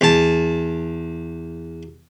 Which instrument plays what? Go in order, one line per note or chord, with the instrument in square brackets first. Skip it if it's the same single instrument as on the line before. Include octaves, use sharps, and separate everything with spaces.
[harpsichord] E2 A5